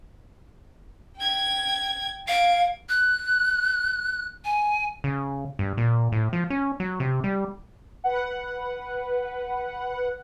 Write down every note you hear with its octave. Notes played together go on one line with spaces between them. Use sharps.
G5 G#6
F5 G#6 D7
F#6
G#5
C#3
G2
A#2
A2
F3
C#4
F#3
C3
G3
B4 F#5